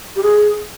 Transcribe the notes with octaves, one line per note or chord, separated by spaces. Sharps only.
G4
G#4